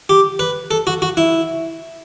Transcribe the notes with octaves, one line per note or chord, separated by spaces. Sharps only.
G4
B4
A4
F#4
F#4
E4